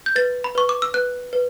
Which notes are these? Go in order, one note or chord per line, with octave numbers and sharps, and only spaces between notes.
G6
B4 A6
B5
B4 C#6
D6
E6
B4 F#6
B4